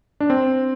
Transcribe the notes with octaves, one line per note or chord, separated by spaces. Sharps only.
D4
C4